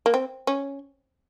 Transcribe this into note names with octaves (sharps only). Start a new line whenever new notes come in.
A#3
C4
C#4